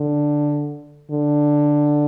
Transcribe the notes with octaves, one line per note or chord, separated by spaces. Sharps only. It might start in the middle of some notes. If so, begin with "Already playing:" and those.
Already playing: D3
D3